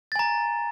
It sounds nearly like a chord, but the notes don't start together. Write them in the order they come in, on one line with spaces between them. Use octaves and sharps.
A6 G#5 A#5